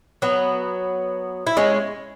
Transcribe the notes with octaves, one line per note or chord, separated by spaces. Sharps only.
F#3 B3
E4
G#3 C#4